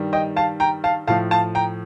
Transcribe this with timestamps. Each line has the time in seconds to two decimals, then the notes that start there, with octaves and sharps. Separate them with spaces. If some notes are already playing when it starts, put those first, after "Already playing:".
Already playing: G2 D#3 G3
0.13 D#5 G5
0.36 F5 A5
0.60 G5 A#5
0.84 F5 A5
1.07 A2 F3 F5 A5
1.31 F5 A5
1.55 G5 A#5